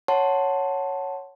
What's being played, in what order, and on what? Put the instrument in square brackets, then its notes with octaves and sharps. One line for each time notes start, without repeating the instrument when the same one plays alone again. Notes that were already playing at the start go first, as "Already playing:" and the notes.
[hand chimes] C#5 F#5 A5 C6